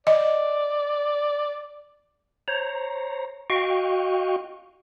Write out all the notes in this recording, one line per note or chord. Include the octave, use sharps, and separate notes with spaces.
D5 D#5
C5 C#5 A#5
F#4 D#5 F5 G5 C#6